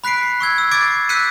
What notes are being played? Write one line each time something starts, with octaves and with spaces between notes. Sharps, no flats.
B5 F#6 B6 C7 D7
C#7
C#6 E6 G#6
E6
D6 E6 G#6 A6 C7 D7
E6 F#6 G6 B6 C#7 D#7